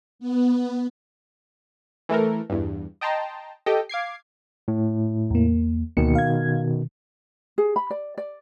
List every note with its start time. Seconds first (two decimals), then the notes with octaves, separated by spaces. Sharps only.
0.19 B3
2.09 E3 A3 A4 A#4
2.50 E2 G2
3.01 D#5 G5 A5 A#5 C6
3.66 G4 A4 D#5 G5
3.89 F5 D6 G#6 C7
4.68 A2
5.31 E2 A#3
5.97 D2 B2 D#3 A#3 C#7
6.15 F5 G#6
7.58 G#4
7.76 B5
7.90 D5
8.18 D5